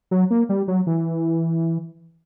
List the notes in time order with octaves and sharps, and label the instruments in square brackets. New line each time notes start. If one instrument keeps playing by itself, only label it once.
[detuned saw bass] F#3
A#3
G3
F#3
E3